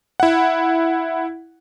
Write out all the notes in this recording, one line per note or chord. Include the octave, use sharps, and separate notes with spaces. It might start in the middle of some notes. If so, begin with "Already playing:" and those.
E4 F#5